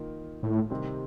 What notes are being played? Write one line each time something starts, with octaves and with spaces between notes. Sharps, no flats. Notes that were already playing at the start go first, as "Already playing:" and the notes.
Already playing: D#3 A#3 F4
A2
C3 D#3 G3 C4